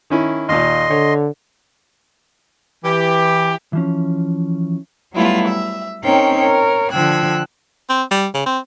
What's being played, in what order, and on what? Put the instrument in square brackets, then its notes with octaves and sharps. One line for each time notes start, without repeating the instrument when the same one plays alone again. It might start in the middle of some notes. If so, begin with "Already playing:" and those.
[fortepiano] D#3 C#4 E4
[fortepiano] D#2 A#2 [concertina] D#5 C6
[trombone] D3 [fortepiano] C#5
[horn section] E3 G4
[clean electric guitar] E3 F3 C#4
[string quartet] F#3 G3 A3 B3 E4 F4
E5
C4 C#4 D#4 A#4 C#5 G5
A#4 C#5
D3 F3 G5 E6 F#6 G#6
[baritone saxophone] C4
G3
C#3
C4